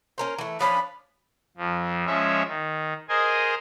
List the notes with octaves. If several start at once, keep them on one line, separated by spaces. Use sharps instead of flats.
C#4 A#4 C5
E3 A3
F3 C#4 D4 B5
F2 F3
F3 G#3 C#4 C#5 E5
D#3
G#4 A#4 C5 D#5 G#5